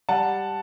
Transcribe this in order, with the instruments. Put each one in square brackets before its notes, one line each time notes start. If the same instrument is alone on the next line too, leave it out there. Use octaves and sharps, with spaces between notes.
[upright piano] G3 F#5 A5